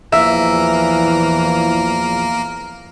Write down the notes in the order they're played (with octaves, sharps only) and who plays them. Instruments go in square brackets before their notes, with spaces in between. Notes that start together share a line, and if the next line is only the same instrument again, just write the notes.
[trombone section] E2 A#2 F3 [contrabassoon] E3 [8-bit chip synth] A#3 A#4 [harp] E5